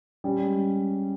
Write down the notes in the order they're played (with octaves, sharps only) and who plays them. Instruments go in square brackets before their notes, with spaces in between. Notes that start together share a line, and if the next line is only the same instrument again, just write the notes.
[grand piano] G3 [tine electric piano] C#4
[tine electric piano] G#3